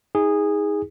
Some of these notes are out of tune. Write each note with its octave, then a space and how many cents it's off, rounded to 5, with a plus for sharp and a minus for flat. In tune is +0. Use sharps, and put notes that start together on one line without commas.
D#4 +30 G#4 -15